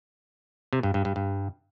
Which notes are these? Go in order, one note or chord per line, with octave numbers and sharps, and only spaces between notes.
C3
G2
G2
G2
G2